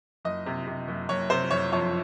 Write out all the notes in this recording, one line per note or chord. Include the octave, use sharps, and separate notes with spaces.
F#1 D#5
C3
C3
F#1
F#1 C#5
C3 C5
F#1 C#5
F2 C#5